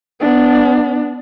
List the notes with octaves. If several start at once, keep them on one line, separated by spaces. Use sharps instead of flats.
B3 D4